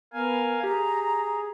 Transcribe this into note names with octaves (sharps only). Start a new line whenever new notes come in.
B3 A#4 F5 G#5
G4 G#4 A#5